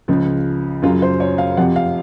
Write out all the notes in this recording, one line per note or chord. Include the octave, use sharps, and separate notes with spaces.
C#2 C#3 F3
F#2 C#3 F#3 F4
C5
C#5
F5
F2 C3 F3 F#5
F5